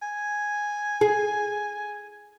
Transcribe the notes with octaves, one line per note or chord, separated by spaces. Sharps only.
G#5
G#4